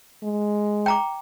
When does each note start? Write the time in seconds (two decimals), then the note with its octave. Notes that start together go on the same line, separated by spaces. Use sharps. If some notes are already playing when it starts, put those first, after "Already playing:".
0.23 G#3
0.86 G5 A#5 D6